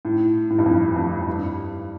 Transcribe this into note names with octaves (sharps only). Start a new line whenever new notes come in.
A2
A2
G2
F2
F2
G2